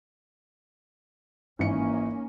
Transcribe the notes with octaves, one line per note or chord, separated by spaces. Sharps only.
G#1 E3 A#3 C#4 C#7